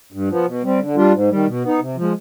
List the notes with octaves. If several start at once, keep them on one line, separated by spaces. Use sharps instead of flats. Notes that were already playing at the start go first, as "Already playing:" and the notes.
G2
F3 B3
B2
G3 C4
D3
G3 D4 F4
G#2
D#3 G3
B2
B3 D#4
C3
F3
G#3